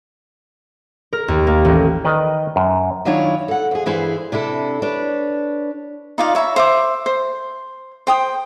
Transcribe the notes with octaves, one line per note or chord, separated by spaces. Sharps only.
A#4
D#2
A#3
A1
D#3 B4 D5 D#5
F#2
D#3 F#3 D4 E4 F4 C#5
A4 F#5
F2 G#4
G2 E3 E4 G#4 C5
C3 D4 E4 A4
D4 B4 C#5
D#4 F4 D5 F5
C#5 E5 A#5 B5
C5 E5 D6
C5
C5 G5 D#6